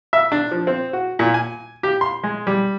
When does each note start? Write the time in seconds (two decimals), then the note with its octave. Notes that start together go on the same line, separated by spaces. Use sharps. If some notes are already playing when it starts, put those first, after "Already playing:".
0.13 E5
0.32 D4
0.51 F3
0.67 C4
0.93 F#4
1.19 A#2
1.34 G#5
1.83 G4
2.01 C6
2.24 G#3
2.47 G3